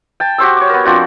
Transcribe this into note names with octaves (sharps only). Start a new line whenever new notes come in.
G5 A5
F#4 G4 C5 E6
C#5 D6
B3 A#4
F3 C4 D4 F#4